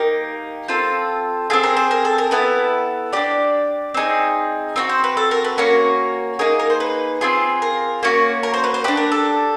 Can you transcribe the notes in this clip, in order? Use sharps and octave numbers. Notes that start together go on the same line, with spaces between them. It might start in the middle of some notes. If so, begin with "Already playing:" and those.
Already playing: A#3 D#4 G4 A#4
C4 F4 A4
C4 F4 G#4 A4
A#4
C5
A#4
A4
A#4
B3 E4 A4 B4
D4 G4 D5
C4 D#4 G#4
C4 D#4 F#4
C5
B4
A4
A#4
B4
A#3 C#4 F#4 A#4
A#3 D#4 G#4 A#4
A#4
C5
B4
C4 F4 G#4
A#4
A#3 C#4 F#4
A#4
C5
B4
C5
D4 G4 B4
A#4
A4